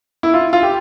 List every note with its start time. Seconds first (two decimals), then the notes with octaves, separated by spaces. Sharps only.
0.23 E4
0.34 F4
0.53 F4
0.63 G4